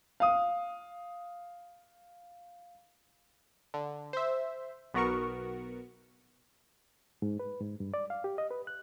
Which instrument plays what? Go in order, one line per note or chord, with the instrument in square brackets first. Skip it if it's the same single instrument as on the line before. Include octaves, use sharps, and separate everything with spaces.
[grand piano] F5 D#6
[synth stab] D3
C5 E5
B1 B3 F#4 A#4 C#6
[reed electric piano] G#2
B4
G#2
G2
D5
F5
G4
D#5
B4
F#6